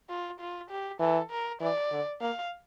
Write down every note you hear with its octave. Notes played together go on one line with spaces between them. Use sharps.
F4
F4
G4
E3 A4
A#4
E3 D5
D3
A#3 F5